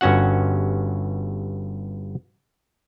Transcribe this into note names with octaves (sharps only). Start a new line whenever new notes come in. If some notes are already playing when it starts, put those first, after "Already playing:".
G1 G2 C#4 F#4 F#5